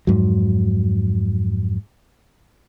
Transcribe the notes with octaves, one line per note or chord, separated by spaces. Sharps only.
F2 G#2 F#3